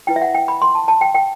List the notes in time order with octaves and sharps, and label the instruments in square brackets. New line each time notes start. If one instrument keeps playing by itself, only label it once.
[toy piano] E4 B4 G5
E5
F#5
G5
B5
C6
A5
A5
G5
G5